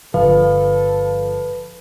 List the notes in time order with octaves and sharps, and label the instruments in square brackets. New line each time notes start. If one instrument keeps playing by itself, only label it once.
[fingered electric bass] G1 D3 [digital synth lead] F3 [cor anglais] A4 [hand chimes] B4